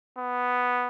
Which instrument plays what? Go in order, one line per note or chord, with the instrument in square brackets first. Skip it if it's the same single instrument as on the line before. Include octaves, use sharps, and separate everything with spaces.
[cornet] B3